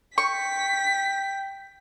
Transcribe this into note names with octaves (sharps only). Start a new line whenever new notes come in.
G5 C#6 B6